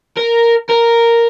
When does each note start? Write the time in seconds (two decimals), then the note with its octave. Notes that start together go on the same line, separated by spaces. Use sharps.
0.17 A#4
0.70 A#4